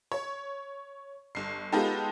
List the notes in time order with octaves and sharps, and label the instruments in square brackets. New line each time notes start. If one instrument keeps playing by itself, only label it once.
[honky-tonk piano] C#5
G1 C7
G#3 B3 D#4 F4 G4 A4